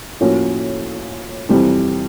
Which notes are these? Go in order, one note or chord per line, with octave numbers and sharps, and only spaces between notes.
A2 F3 A#3 C#4 F#4
F2 C3 E3 G3